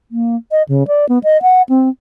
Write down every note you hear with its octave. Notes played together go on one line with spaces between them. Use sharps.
A#3
D#5
C#3
D5
B3
D#5
F#5
C4